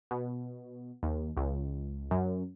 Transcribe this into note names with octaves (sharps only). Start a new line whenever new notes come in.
B2
D#2
C#2
F#2